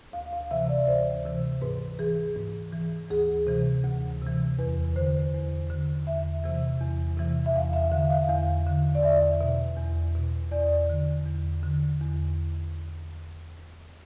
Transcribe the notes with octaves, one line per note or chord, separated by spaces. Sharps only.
D2 F5
F5
C3 E3 E5
D5
D2 C5
C3 E3
G#2 B4
E3 G#4
G#2
E3
D2 G#4
C3 E3
D2
C3 E3
E2 B4
D3 C5
E2
D3
E2 E5
C3 E3
E2
C3 E3
E5
E2 F5
E5
D3 F5
F5
E2 F5
D3
D5
E2 E5
B2
E2
B2
E2 D5
D3
E2
D3
E2